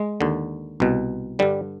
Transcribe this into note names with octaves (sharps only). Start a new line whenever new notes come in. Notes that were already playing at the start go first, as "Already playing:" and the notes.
Already playing: G#3
D#2 D3
C2 B2
G2 D3 G3